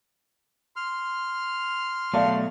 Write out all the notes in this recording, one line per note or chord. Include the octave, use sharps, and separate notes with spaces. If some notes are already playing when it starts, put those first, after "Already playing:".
C6 F6
B2 F#3 A3 D5 F5 A5